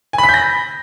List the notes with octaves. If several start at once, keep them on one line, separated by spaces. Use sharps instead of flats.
G#5
B5
B6
G6
A#6